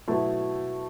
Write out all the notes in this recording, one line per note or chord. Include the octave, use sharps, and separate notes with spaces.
B2 F#3 A3 E4